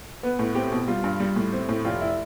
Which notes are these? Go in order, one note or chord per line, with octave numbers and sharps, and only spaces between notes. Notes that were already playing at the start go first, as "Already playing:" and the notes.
B3 B4
A2
C4 G4
B2
G3 F4
G2
G3
A2
C4
A2
F1 F4
E4